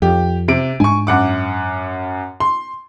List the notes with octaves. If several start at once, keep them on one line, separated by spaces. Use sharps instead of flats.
F2 G4
C3 D7
G#2 G#3 D4 G#5 C#6
F#2 F#5 D6
C6